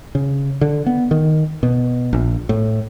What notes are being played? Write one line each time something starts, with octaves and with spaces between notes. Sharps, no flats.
C#3
D3
B3
D#3
B2
A#1
A2